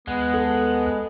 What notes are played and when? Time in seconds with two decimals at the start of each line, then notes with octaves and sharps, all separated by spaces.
0.07 D#2 G#3 B3 F#5 F#6
0.34 A4